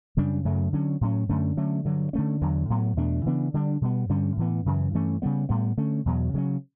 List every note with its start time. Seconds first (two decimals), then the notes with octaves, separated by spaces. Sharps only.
0.17 F#2 C#3 G3 D4
0.45 F#2 C#3 F#3 A3
0.73 D3 F#3 C#4
1.01 A2 F#3 C#4
1.29 F#2 D3 A3 C#4
1.57 D3 F#3 A3 C#4
1.85 G2 D3 F#3
2.13 D3 A3 C#4
2.41 E2 D3 F#3
2.70 A2 F#3 B3
2.97 E2 B2 A3 D4
3.26 C#3 E3 B3 D4
3.54 D3 G3 D4
3.81 B2 G3 B3
4.09 G2 D3 G3 C#4
4.37 A2 E3 B3
4.66 F#2 C#3 E3
4.94 G2 E3 A3 C#4
5.22 C#3 G3 B3
5.49 A2 G3 B3
5.77 D3 A3 C#4
6.06 E2 B2 F#3
6.34 C#3 F#3 C#4